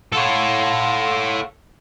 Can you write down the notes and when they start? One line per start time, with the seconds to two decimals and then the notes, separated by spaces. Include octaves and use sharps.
0.13 A4 C#5 F5 F#5 C6